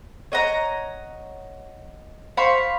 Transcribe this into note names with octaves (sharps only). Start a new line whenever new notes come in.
C#5 D#5 F#5 A#5
C5 F5 B5 C#6